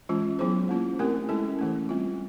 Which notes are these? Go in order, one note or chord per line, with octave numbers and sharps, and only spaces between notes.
E3 G#3 C#4 F4
F#3 B3 E4 G#4 C5
A#3 C#4 F4
A3 C4 E4 G4 A#4
G#3 C#4 E4 A4
E3 A3 C#4
G3 C4 F4